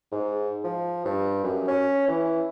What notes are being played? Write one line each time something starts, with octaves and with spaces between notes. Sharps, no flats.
G#2
F3
G2
F#2
C#4
E3